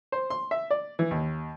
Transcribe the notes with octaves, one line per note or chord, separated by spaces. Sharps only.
C5
C6
E5
D5
E3
D#2